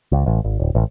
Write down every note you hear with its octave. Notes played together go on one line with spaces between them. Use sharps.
C#2
A1
G#1
D1
A1